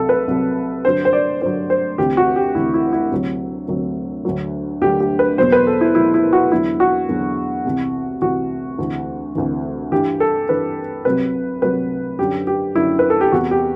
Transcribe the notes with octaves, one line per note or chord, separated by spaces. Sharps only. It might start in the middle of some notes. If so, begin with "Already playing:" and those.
Already playing: C2 C3 F#3 A4
B4
C2 C3 F#3
G2 D3 F#3 C5
C5
D5
G2 D3 F#3 C5
C5
D2 C3 E3 G4
F#4
G4
D2 C3 E3 E4
E4
E4
D2 C3 F#3
D2 C3 F#3
D2 D3 F#3
D2 D3 F#3 G4
G4
B4
E2 B2 F#3 C5
B4
A4
E4
E2 B2 F#3 E4
E4
F#4
E2 D3 F#3 E4
F#4
E2 D3 F#3
C2 C3 E3
C2 C3 E3 F#4
D2 C3 E3
D2 C3 E3
G2 E3 G4
A4
G2 E3 B4
C2 C3 F#3 B4
C2 C3 F#3 B4
F#2 D3 F#3 G4
G4
F#2 D3 F#3 E4
B4
A4
G4
E2 C3 E3 F#4
G4